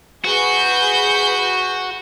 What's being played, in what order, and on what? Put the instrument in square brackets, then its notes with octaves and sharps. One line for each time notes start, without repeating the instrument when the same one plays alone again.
[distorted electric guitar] F#4 [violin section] G#4 B4 G6